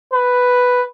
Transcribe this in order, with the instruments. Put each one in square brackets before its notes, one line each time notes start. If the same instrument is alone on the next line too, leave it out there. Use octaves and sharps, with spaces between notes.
[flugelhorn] B4